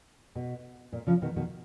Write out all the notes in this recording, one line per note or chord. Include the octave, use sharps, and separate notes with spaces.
B2
A#2
C#3 F3
B2 D#3
B2 D#3